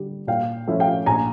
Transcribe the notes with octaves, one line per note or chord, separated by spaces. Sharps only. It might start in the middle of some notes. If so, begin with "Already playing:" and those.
Already playing: D3 G3
A#2 F5 G5
F3 A3 C#4 E4
F5 G5
A#1 G#5 A#5